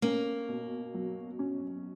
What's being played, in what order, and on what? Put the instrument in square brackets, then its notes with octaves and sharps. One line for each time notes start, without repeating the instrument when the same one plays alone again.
[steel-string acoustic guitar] A#3 [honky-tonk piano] C#4
[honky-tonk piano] B2
F#3
C#4